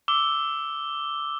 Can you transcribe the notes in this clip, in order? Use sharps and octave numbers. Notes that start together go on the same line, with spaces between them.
D6 E6 G7